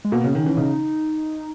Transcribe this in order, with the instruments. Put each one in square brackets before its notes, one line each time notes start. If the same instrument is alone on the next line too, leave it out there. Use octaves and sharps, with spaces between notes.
[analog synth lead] G#3
[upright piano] B2 [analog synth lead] A#3
[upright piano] C#3
[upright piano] D#3 [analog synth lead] C#4
[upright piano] E3
[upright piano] C#3 [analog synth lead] D#4